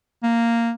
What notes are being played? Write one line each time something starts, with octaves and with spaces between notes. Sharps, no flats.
A#3